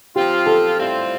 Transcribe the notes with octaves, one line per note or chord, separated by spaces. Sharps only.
F3 C4 F4 G4
A4
A2 G3 C4 F4